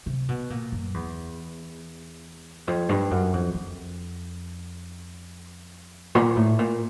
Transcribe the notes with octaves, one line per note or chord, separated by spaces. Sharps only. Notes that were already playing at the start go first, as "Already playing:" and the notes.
C3
B2
A#2
F#2
E2
F2
G2
F#2
F2
F2
A#2
A2
A#2